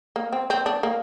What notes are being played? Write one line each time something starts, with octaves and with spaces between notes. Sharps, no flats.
A#3
C4
C4
D4
A#3